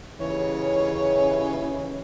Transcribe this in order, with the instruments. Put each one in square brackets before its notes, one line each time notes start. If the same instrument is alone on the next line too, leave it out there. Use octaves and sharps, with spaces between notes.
[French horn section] D#2 C#3 [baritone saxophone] E3 [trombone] C#4 [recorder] C#5